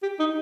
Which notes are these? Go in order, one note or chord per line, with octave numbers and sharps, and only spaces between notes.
G4
D#4